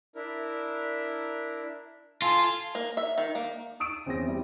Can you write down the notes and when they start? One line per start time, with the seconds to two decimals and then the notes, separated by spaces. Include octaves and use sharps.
0.15 D4 E4 A#4
2.22 F4 A4 G#5 A5
2.75 A#3
2.97 E5
3.18 D#3
3.35 A#3
3.80 C#6 D#6 E6 D7 D#7
4.06 E2 C4 C#4 E4 G5 A#6
4.27 G3 C4 E4